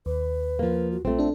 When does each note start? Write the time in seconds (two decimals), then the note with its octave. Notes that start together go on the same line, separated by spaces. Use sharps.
0.06 D#2 B4
0.59 F3 A#3
0.92 F#4
1.05 A#1 A3 C4 F4
1.19 D4 A4